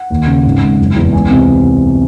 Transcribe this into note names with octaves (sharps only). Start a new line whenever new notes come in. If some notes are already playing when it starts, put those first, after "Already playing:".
Already playing: F#5
D#2
C#3
G#1
G#2
F#1
E2
C#2 G#5
C3